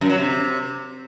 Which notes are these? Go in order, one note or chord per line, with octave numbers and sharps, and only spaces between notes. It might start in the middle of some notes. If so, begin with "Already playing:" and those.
F#2
F#3
C3